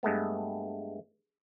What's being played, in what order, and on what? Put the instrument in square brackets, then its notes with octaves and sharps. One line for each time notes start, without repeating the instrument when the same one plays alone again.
[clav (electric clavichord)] G2 G#3 A3 B3